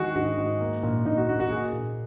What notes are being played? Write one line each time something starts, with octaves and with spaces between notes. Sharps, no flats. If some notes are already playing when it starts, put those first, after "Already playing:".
Already playing: D#3 G#3 F#4 G#4
G#2 F#4
G#2
A#3
A#2
A#2 D#4
F#4
A#3 F#4
F#4
A#3 G#4
A#2